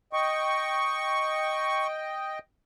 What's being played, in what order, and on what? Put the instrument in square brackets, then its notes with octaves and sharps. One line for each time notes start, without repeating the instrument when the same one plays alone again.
[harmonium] D#5 G5 [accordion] C#6